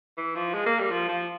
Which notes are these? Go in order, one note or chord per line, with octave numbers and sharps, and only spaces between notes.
E3
F3
G#3
A#3
G3
F3
F3